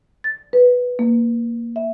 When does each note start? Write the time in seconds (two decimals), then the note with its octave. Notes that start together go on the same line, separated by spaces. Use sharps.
0.24 A6
0.53 B4
0.99 A#3
1.76 E5